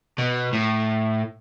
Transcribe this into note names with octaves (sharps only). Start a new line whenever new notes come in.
B2
A2